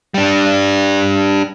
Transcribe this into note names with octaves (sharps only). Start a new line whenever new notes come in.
G3 D4